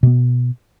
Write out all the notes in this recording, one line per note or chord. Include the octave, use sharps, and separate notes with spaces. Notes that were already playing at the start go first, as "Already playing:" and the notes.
B2 B3